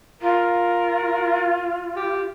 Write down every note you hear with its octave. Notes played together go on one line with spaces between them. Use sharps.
F4 A#4
G4